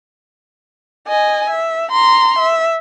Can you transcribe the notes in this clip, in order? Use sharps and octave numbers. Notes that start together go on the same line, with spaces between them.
D#5 G#5
E5
A#5 C6
E5